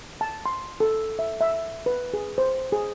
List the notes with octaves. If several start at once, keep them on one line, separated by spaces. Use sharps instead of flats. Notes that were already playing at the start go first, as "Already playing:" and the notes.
A5
C6
A4
E5
E5
B4
G#4
C5
G#4